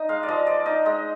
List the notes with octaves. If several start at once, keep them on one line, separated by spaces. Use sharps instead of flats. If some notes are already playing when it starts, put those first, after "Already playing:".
Already playing: D#4 D#5
G#3 F5
D5
F3 D#5
F3 D5
D#4 D#5
G#3 D#5